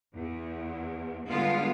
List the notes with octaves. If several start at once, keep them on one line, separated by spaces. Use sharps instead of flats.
E2
D3 G3 G#3 B3 F4